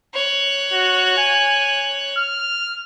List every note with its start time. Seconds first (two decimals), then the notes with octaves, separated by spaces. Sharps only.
0.14 C#5 F#6
0.73 F#4
1.17 G#5
2.18 F6